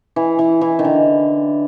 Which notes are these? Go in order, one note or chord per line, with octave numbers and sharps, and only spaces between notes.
E3
E3
E3
D#3
D3